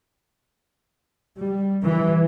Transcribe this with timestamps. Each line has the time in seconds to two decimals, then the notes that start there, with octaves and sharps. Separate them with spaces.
1.37 G3
1.84 E3